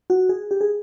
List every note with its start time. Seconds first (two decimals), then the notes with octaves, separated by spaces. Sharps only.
0.10 F#4
0.29 G#4
0.51 G4
0.61 G#4